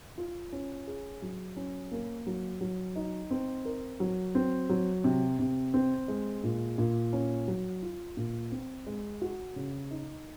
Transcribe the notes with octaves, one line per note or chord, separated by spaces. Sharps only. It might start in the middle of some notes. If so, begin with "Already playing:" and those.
F4
C#4
G#4
F#3
C#4
A#3
F#3
F#3
D#4
C4
A#4
F#3
C4
F#3
C3
C3
C4
G#3
A#2
A#2
C#4
F#3
F4
A#2
C4
G#3
F#4
C#3
D#4